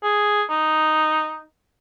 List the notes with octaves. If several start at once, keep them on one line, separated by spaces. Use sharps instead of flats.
G#4
D#4